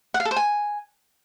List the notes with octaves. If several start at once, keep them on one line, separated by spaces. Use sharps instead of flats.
F#5
F5
A4
C5
G#5